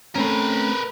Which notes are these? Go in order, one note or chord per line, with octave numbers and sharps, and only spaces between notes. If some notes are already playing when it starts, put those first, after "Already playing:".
A3 C4 C#4 A#4 B4